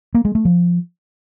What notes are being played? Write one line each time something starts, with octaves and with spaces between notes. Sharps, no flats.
A#3
G#3
A3
F3